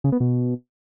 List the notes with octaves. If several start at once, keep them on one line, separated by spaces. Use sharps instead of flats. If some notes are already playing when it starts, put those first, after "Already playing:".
C#3
B3
B2